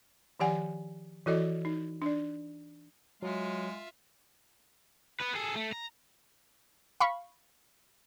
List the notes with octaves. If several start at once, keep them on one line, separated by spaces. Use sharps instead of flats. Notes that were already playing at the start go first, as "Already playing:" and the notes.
D#3 F3 G4 D5 F#5 G#5
E3 E4 F#4 A4 D5 D#5
D#4
D4 D5
F#3 G#3 F4 E5
B3 B4
G#4 A4
A3
A#5
F5 B5 C#6